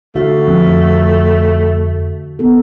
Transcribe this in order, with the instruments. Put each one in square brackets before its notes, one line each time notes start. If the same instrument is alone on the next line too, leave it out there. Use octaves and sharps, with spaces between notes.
[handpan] D3 F#4 F5 [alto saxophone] A3
[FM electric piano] F2
[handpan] B3 A4